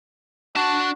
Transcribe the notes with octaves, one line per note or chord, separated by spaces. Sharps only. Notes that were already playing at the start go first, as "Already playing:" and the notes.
D4 F#4 A5